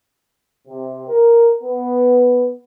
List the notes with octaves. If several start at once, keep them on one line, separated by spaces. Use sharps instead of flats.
C3
A#4
B3